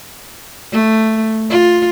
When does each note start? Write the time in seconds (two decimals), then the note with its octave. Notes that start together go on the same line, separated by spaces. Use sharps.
0.72 A3
1.50 F4